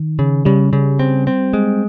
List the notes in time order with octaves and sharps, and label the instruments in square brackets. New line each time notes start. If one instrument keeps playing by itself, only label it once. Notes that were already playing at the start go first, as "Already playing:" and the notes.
Already playing: [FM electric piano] D#3
[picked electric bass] C#3
[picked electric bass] C#3 [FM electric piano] G3
[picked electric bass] C#3
C4
C4
G#3